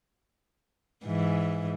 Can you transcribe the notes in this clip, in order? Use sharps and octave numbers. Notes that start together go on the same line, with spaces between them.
G#2 E3